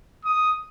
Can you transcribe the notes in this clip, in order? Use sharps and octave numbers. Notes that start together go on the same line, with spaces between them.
D#6